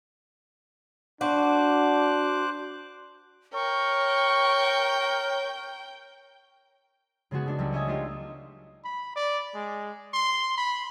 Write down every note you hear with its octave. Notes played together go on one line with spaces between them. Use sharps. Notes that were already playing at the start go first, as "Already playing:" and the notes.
D4 F#4 C5 D6 F#6
A#4 C#5 G5 C#6
C#3 G#3 B3 F#4 G#4
A3 D4 F#4
C#2 F#3 G3 A3
C#5 D#5 E5 G#5
G#3 A3 D4 D#4 F4 G4
B5
D5
G#3
C6
B5